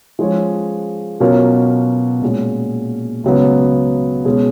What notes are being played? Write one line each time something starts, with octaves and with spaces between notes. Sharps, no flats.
F3 G#3 C#4 G#4 C#5
B2 F#3 C#4 F4 A#4
A#2 G#3 C#4 F#4
C#2 C#3 F#3 B3
B2 G#3 C#4 G#4